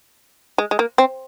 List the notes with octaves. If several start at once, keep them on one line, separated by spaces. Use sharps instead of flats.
G#3
G#3
A#3
C4